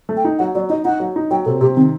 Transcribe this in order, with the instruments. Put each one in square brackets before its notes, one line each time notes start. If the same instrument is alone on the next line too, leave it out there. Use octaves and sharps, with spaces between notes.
[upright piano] A3
[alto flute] G5
[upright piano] D#4
[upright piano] F#3 [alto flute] F#5
[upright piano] F#3 [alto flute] D5
[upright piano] D#4 [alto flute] D#5
[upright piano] D#4 [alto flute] F#5
[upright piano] F#3
D#4
[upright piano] F#3 [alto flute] G5
[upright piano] C3 [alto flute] A4
[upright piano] C3 [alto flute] G4
[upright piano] D#3 [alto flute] C4